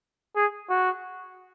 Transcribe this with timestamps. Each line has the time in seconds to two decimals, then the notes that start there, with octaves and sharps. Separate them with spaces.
0.36 G#4
0.70 F#4